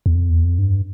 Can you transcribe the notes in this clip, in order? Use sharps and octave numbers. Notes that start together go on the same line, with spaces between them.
E2
F2
E2
F2
G2